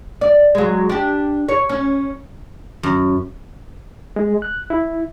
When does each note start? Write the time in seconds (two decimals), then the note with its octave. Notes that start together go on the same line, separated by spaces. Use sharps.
0.21 D5
0.55 F#3 G#3
0.89 D4 G4
1.49 C#5
1.69 C#4
2.83 F#2
4.16 G#3
4.42 F#6
4.70 E4